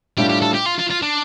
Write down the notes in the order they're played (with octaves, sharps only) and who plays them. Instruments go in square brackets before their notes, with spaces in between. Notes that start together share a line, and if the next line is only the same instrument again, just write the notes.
[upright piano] A2 G3 D4 F4 [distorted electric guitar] G4
[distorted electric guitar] G4
A4
G4
F4
F4
F4
D4